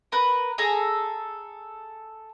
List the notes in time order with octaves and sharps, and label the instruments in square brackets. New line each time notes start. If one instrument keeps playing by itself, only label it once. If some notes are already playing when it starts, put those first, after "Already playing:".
[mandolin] A#4 B4
G#4 A4 A#5